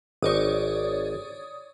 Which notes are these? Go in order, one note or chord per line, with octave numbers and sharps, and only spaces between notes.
G#1 D#4 C#5 D5 D#6